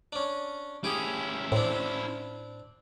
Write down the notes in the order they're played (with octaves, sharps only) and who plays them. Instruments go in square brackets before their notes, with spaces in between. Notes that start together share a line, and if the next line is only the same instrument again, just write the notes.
[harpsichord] C#4 D4
[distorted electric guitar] C#4 E4 [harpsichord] G4 G#4
[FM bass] A2 [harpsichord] C4 D4